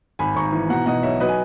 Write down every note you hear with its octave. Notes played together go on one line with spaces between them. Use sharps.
G#1 G#5 B5
G#1 A#5 C#6
E3
B2 F#5 A#5
B2 D#5 F#5
B1 C#5 E5
F#3 B4 D#5
G#5